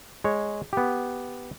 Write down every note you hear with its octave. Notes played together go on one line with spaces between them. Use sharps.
G#3 C#5
B3 G4